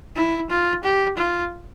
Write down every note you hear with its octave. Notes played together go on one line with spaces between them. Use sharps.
E4
F4
G4
F4